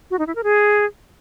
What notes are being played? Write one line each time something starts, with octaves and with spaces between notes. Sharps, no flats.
F#4
D#4
E4
A#4
G#4